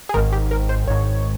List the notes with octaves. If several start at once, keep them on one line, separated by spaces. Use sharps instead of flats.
G#4
G#1 G#2 D#3 A#4
G4
A#4
C5
G#1 G#2 D#3 C#5